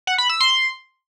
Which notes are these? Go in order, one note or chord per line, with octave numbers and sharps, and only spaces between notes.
F#5
B5
E6
C6